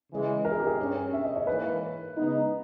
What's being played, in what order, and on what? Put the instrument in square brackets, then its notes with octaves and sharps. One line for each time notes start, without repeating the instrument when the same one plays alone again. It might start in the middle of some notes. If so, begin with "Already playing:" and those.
[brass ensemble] C#3 E3 G#3
[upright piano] A#4
G#4
G4
G#4
[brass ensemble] G2 G3 C#4
[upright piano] E5
D#5
C#5
[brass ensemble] G#2 E3 A#3 [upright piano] B4
[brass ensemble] C#3 G#3 B3 D#4